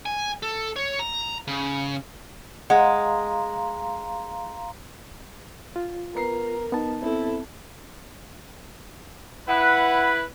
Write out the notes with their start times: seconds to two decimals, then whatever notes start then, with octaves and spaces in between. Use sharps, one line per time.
0.06 G#5
0.43 A4
0.76 C#5
0.99 A#5
1.48 C#3
2.70 G#3 F5 F#5 A#5 C6
5.76 F4
6.15 B3 A#4 A#5 C7
6.72 B3 D#4 A5
7.02 C4 E4 A4
9.48 E4 B4 F#5